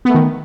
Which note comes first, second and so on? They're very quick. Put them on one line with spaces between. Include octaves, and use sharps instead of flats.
B3 A3 D#3